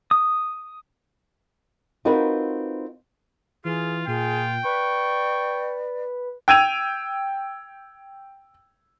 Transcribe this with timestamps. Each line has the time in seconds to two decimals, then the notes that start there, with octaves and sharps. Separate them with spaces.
0.11 D#6
2.05 C4 D#4 F4 F#4 A#4 B4
3.65 E3 F4 G#4
4.07 A#2 F4 G#4 G5
4.65 B4 D5 C#6
6.48 G5 E6 G#6 D#7 F7